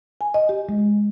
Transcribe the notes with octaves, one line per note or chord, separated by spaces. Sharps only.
G#5
D#5
G4
G#3